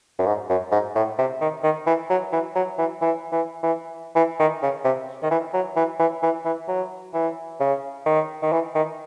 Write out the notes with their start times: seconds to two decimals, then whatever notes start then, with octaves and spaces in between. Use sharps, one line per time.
0.19 F#2
0.26 G#2
0.50 F#2
0.72 G#2
0.96 A2
1.18 C3
1.41 D#3
1.63 D#3
1.86 E3
2.10 F#3
2.32 E3
2.55 F#3
2.78 E3
3.02 E3
3.32 E3
3.63 E3
4.16 E3
4.39 D#3
4.62 C#3
4.84 C3
5.23 D#3
5.31 E3
5.53 F#3
5.76 E3
5.99 E3
6.23 E3
6.45 E3
6.68 F#3
7.14 E3
7.60 C#3
8.06 D#3
8.42 D#3
8.52 E3
8.75 D#3